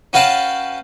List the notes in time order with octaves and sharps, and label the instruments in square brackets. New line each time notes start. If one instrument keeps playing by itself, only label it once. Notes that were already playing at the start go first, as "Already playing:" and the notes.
[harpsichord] C#4 F#4 B4 F5 G5 A5